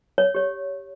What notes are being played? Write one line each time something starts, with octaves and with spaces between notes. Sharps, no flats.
C#5
G4 C#5